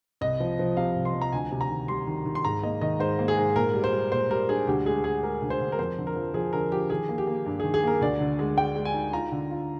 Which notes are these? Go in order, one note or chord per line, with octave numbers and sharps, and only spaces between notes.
C2 D#5
F3
F3
C3 F5
C2
C6
F3
A#5
D2 G#5
C3
A#5
D#3
G3 C6
D#3
D#3
C6
G#2 A#5
A#3 D#5
D#3 D#5
G#2 C5
A#3
G#4
G#2
A#2 A#4
G3
C5
G3
A#2 C5
G3 A#4
D4 G#4
D2 G4
G#3 G#4
G#3 G#4
G#3 A#4
D2
C5
D2
A#4
F2 C5
D3
A#4
F3
F3 G#4
D3 A#4
F3 G4
D#3 G#4
A#3
G4
A#3
G2
D#3 G#4
G#4
A#3 A#4
D2 D5
D3
G#3
G#3 G5
G#3
G#5
D#4
F4 A#5
D3
F4